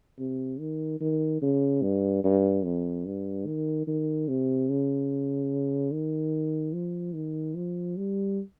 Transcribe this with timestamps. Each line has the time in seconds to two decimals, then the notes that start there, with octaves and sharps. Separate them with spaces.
0.19 C3
0.60 D#3
1.00 D#3
1.42 C#3
1.82 G2
2.24 G2
2.65 F2
3.06 G2
3.46 D#3
3.87 D#3
4.28 C3
4.69 C#3
5.92 D#3
6.74 F3
7.15 D#3
7.56 F3
7.97 G3